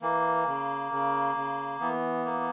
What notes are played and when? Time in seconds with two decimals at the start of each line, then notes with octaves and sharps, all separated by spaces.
0.02 E3 A#3
0.47 C#3
0.92 C#3
1.36 C#3
1.80 E3 B3
2.25 A#3